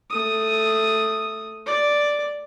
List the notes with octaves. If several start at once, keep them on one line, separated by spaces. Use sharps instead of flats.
A3 D#6
D5